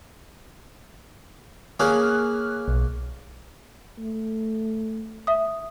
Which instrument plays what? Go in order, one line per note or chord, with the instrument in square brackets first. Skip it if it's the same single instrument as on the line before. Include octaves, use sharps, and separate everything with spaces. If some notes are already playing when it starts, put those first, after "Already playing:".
[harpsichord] A#3 C#4 G#4 [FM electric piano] F6 F#6
[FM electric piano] B1
[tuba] A3
[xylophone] E5 D#6